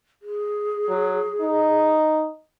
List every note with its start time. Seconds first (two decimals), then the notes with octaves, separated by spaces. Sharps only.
0.22 G#4
0.88 F#3
1.41 D#4